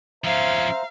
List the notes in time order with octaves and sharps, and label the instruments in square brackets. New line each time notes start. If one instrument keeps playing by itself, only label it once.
[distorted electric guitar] F3 C#4 [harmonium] C5 E5 A#5 [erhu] F5